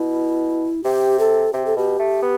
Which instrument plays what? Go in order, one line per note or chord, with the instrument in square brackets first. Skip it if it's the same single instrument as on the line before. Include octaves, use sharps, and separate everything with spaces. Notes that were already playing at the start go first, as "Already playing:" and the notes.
Already playing: [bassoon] B2 [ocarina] E4
[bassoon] C3 [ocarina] G4
[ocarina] A4
[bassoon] C3 [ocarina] G4
[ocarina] A4
[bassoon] B2 [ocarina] G4
[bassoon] A3
B3